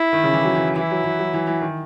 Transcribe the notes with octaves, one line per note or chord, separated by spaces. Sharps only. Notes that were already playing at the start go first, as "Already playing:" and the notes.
Already playing: E4
D#3
C#3
E3
F#3
E3
E3 E4
F#3
E3
F#3
E3
E3
D#3